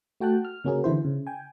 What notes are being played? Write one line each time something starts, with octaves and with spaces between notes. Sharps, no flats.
A3 F#4 G5 A5 F#6
F6
C#3 A#3 C#4 F#4 G#4 A#4
D3 E3 E4 C5
C#3
G5 G#5